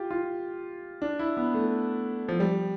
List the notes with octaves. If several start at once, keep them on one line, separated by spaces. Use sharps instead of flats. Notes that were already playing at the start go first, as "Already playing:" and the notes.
Already playing: F4 G4
F4
D4
E4
B3
A3
F3
G3